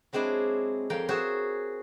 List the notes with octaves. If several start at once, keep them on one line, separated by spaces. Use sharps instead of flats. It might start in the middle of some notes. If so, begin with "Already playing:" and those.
F#3 G#3 C4 D4 E4
F2 A#4 F5 G5
F#4 G#4 C5 C#5 E5